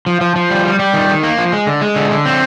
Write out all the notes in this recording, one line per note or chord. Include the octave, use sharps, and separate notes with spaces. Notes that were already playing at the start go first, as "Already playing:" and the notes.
F3
F3
F3
G3
G3
G3
D#3
D#3
A#3
F3
G#3
D3
G#3
D3
D3
C4